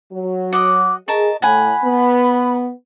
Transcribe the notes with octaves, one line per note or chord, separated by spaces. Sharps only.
F#3
D#5 F#5 D6
G#4 A#4 D#5 A5 C#6
A2 F#5 G#5 B5
B3